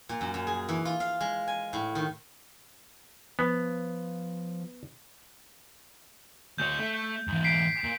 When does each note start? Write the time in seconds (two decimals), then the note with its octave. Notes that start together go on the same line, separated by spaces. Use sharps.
0.09 A#2
0.21 F#2
0.34 F#2
0.47 G#4
0.69 E3
0.85 F4
1.00 F5
1.21 G#3
1.48 G#5
1.73 A2
1.95 D#3
3.39 F3 B3
6.58 D2 C#5 G6
6.79 A3
7.28 G#2 E3
7.44 B6 C7 D7
7.84 A#2